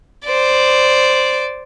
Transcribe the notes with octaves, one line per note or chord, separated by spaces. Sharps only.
C5 D5